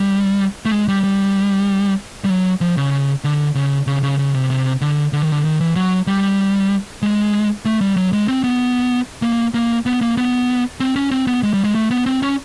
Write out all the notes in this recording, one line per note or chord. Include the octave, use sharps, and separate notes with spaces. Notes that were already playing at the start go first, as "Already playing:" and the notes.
Already playing: G3
A3
G#3
G3
G3
G3
F#3
F3
C#3
D3
C#3
C#3
C#3
C#3
C3
C3
D3
D3
D#3
D3
D#3
E3
F#3
G3
G#3
A3
G3
F#3
G#3
C4
B3
A#3
A#3
B3
A#3
B3
C4
C#4
C4
B3
G#3
G3
G#3
A3
B3
C4
C#4